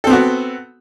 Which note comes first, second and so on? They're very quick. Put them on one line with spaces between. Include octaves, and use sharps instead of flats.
A4 C4 B3 F#4